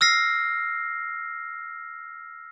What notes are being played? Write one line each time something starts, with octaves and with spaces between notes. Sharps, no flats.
E6 F6 A#6 C7